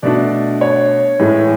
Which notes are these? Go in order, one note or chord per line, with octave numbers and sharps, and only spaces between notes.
B2 A3 D4 D5
C#5
A2 E3 G#3